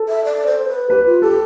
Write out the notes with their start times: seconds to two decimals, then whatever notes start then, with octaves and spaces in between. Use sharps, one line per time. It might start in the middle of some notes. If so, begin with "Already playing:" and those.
Already playing: A4
0.09 E5
0.25 D5
0.47 C5
0.68 B4
0.90 G4 B4
1.06 F4
1.22 G4 A4